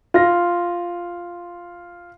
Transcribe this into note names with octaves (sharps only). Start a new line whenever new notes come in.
F4 A#6